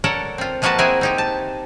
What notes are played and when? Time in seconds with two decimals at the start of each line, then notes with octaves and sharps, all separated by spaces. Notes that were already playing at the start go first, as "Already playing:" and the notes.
0.04 A4 A#4 C#5 D5 F#5 A5
0.38 C4 F4
0.62 F3 G#3 A#3 F#4 B4 A5
0.78 C4 E4 G#4 A#4 E5 G#5
1.01 C4 D#4 G4
1.18 A5